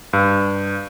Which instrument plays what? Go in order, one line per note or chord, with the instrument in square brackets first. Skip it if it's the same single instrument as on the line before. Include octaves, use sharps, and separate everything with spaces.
[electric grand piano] G2